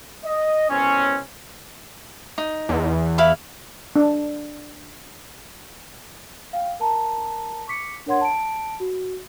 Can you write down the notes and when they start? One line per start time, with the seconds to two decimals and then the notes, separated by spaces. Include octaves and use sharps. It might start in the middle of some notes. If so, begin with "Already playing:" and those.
0.24 D#5
0.70 C2 B2 C4 C#4
2.38 D#4
2.69 E2
3.18 E4 F5 B5
3.96 D4
6.53 F5 G5
6.80 A#4 A5 A#5
7.68 C#6 D6 B6 C#7
8.06 D4 A#4 C#5 F#5 C6 G#6
8.21 A5 D7
8.80 F#4